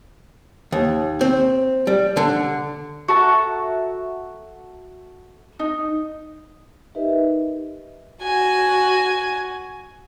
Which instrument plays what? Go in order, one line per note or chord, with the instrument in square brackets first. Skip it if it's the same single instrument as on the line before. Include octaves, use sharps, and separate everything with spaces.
[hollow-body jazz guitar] D#2
C4
G3
D3
[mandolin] F#4 A4 E5 A#5
D#4
[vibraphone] D#4 G4 A#4 B4 D#5 E5
[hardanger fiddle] F#4 G#5